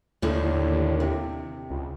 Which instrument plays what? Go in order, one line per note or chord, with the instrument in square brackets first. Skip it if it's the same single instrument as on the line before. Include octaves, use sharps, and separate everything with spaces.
[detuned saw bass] D#2 [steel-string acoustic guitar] A2 D3
[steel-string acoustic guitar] C3
[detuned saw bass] C#2